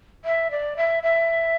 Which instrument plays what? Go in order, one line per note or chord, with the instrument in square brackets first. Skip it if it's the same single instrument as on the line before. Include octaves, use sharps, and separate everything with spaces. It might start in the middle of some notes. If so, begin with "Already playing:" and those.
[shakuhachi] E5
D5
E5
E5